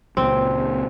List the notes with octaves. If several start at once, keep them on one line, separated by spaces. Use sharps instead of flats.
C#2 A#2 C4